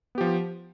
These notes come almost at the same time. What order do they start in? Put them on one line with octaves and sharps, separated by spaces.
B3 G4 F3